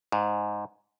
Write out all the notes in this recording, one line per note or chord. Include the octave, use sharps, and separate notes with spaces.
G#2